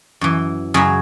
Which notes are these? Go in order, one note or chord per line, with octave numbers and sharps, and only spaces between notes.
F#2 E3
F#2 C#3 F#3 G#4